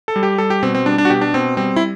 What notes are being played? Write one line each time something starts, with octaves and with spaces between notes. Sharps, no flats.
A4
G3
G4
G3 A4
G4
B2 C4
C4
G3 D4
D4
F#4
B2 G4
D4
B2 C4
G3 C4
E4